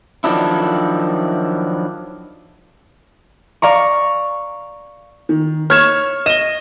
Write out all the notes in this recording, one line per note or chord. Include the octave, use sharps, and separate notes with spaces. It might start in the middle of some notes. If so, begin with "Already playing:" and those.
D#3 F3 F#3 D4 E4
D5 F5 A#5 C#6
D#3
C#5 F6 G#6 E7
D#5 E7 G7